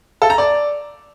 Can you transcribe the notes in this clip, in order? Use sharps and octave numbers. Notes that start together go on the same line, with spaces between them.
A4
A#5
D5